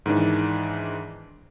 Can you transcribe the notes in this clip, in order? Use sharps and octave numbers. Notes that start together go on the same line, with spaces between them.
G#2 D#3 E3 D4